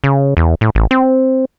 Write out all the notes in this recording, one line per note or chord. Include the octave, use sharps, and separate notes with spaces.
C#3
E2
A2
A1
C4